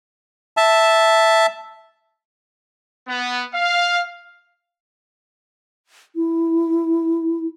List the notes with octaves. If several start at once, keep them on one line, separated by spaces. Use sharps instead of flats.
E5 A5
B3
F5
E4